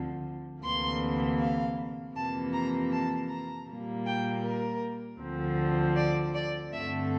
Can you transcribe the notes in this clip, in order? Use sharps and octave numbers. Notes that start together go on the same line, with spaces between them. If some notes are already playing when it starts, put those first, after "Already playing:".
Already playing: D2 D3 F3 C4
D2 C3 E3 A#3 C6
F5
F2 C3 E3 A#3 A5
A#5
A5
A#5
A#2 G3 A#3
G5
A#4
D2 D3 F3 C4
D5
D5
G2 D3 A3 C4 E5